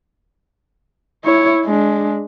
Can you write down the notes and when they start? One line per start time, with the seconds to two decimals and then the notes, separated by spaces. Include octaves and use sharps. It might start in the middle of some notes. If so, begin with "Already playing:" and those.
1.25 E4 C#5
1.65 G#3 D4